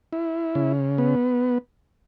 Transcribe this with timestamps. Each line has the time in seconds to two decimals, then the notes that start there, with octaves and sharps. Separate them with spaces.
0.13 E4
0.55 C#3
0.98 B3